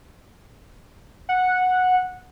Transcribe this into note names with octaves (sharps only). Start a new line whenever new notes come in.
F#5